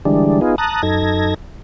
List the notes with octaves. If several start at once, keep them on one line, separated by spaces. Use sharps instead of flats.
D3 E3 G3 G#3 D4
B3 D#4 F4 G#4
A5 A#5 D#6 F#6
F#2 D#4 A4 G#6 A#6